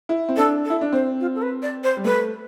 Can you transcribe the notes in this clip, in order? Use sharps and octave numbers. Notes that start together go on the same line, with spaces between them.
E4
C4
D4 A4
A4
E4
D4
C4 C5
F4
A4
B4
D5
C5
G3
A3 B4